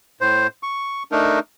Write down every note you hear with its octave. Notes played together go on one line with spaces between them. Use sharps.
A2 C5
C#6
A3 D4 D#4 A#4